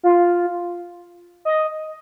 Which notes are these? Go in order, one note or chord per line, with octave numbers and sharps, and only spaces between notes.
F4
D#5